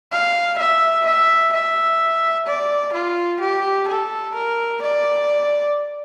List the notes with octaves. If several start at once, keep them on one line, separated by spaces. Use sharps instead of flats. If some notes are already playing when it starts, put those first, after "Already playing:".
F5
E5
E5
E5
D5
F4
G4
A4
A#4
D5